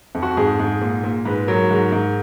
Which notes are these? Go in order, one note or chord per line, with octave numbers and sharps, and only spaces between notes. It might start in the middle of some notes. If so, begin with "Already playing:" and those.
F2
F#4
G#2 G#4
G#2
A#2
A#2
G#2 B4
F#3 A#4
G#2
G#2